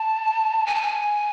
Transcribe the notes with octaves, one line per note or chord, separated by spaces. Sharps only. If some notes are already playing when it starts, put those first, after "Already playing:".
Already playing: A5
G#5
A5
G#5